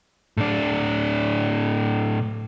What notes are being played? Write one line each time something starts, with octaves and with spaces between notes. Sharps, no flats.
A2 D4